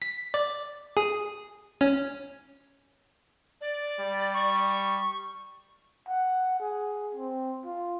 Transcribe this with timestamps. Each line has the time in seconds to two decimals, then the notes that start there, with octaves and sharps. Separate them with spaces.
0.02 B6
0.34 D5
0.97 G#4
1.81 C#4
3.61 D5
4.00 G3
4.34 C#6
6.08 F#5
6.60 G#4
7.15 C4
7.65 F4